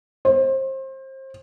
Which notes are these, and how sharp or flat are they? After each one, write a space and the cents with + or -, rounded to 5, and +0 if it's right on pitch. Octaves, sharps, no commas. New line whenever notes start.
C5 +30